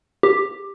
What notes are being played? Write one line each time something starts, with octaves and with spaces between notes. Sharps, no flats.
G4